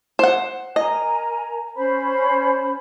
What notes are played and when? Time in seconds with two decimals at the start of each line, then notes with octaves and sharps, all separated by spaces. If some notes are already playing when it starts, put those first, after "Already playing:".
0.19 C5 F#5
0.76 A#4 D#5 G#5 A#5
1.75 C#4 C5 B5